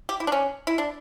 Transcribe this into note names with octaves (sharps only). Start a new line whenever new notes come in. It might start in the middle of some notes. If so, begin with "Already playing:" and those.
G4
E4
D4
C#4
E4
D4